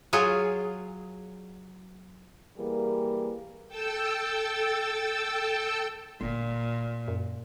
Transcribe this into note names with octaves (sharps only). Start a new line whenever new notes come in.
F#3 F4 G#4 C#5
E3 G3 A#3 G#4 A#4
A4 G5 A5 E6
G1 A#2
F#2